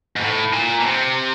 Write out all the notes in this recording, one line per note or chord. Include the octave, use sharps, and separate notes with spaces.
G#2
A2
A#2
B2
C3